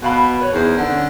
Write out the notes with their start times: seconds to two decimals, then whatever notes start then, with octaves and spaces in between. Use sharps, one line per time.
0.02 B2 B4 F5 B5
0.41 B4 C#5
0.53 E2 D#4 G#4 C5
0.77 D3
0.91 C#4